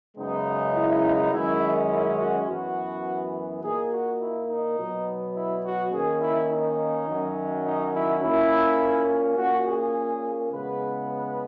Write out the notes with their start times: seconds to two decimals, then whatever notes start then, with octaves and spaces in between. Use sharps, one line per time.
0.17 F#2 C#3 G#3 B3 D#4
0.75 E4
1.32 F#2 D#3 G#3 C#4 E4
1.90 E4
2.19 F#4
2.47 F#2 E3 B3 F#4
3.62 A#2 A#3 D#4 G#4
3.91 F#4
4.20 E4
4.48 D#4
4.78 B2 F#3 B3
5.35 E4
5.64 F#4
5.92 D#3 A#3 C#4 G#4
6.20 E4
6.50 D#4
7.08 F#2 D#3 F#3 C#4
7.64 D#4
7.94 E4
8.22 A#2 A#3 C#4 E4
9.37 A#2 A#3 C#4 F#4
9.66 G#4
10.52 E2 C#3 G#3 B3 B4
11.09 B4